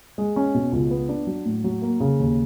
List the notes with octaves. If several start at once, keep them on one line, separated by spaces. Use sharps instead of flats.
G#3
C#4
B2
C#2
B3
D4
F#3
A2
F#3
A#3
C#3
D#2